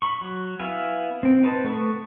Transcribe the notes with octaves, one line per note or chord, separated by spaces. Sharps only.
B5 C#6
F#3
B3 E4 F5 G#5
C4 G5
D#4 B4 C5 A5
A3 B3 B4 F#5 C#6